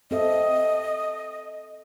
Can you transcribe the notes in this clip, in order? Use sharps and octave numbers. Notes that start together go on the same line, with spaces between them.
C4 A4 D#5 E5